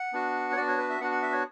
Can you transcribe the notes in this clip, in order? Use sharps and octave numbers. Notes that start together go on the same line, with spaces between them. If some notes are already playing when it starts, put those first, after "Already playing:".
Already playing: F#5
B3 D4 F#4
C#5
B3 D4 F#4 D5
C#5
B4
E5
B3 D4 F#4 F#5
F#5
E5
C#5